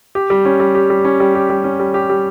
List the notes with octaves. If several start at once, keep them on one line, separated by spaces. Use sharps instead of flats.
G4
G3
C#4
G3
G4
G3
C#4
G3
G4
G3
C#4
G3
G4
G3